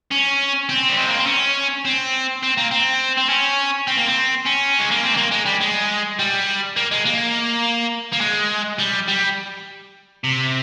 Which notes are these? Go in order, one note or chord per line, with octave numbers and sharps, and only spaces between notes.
C#4
C4
G3
G#3
A#3
C4
C#4
C4
C4
A#3
C4
C4
C#4
C4
A#3
C4
C#4
G#3
A#3
C4
G#3
A#3
G#3
G3
G#3
G3
A#3
G#3
A#3
A#3
G#3
G3
G3
C3